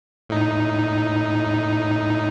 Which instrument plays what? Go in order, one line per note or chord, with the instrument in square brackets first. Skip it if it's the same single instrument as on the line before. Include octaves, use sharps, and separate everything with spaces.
[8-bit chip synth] A2 D#4